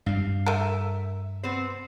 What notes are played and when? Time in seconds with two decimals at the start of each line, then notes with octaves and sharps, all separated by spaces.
0.06 G2 G3 F5
0.46 A3 A#4 E5
1.43 B3 C4 C5